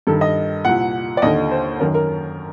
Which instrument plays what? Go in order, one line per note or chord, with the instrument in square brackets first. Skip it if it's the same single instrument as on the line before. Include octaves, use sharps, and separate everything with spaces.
[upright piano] G2 D#3 A4
D#5
C2 A#2 F#5
D5
D#2 D3 D#5
C5
F#2 D#3 A#4
A#4